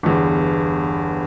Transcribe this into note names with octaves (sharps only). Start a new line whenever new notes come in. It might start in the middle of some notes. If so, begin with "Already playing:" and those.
G1 E2